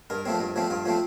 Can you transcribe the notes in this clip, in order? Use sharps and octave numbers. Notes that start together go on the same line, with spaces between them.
G2 A#4
F3 A3 C4
G2
F3 A3 C4
G2 F4
F3 A3 C4